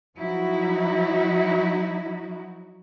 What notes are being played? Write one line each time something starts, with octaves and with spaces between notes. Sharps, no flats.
F3 F#3 D#4 E4 F#4